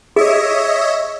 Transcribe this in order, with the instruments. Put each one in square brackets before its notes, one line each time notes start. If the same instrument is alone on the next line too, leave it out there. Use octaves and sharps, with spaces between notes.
[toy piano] G#4 [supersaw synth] C#5 D#5 E5